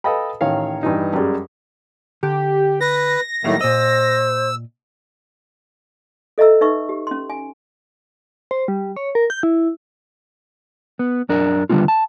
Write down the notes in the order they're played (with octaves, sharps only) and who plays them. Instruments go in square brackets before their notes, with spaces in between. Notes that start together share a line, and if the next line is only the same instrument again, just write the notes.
[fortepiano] A4 B4 D#5 F5 G5 B5
A1 D#3 C#5 F5
G2 E3 D#4
F#2 G3 G#3
[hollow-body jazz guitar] D3 [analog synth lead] G4
[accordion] B4 [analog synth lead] A#6
[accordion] A2 D#3 A3 [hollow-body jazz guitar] F#3 G3 A#3
[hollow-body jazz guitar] A#2 D#5 [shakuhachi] C5 [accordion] E6
[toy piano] A4 D#5 E5 A#5 E6
D#4 B4 E5 C#6
G4
C#4 C6
G#5
[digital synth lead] C5
G3
C#5
A#4
G6
E4
[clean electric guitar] B3
F#2 D4 A#4
D#2 D3 G3 B3 C4 F4
A5